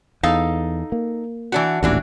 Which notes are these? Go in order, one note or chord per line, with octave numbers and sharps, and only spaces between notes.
E2 D#4 A4 F5
A#3
E3 D4 F#4
D#1 A1 D#2 E3 D4 F#4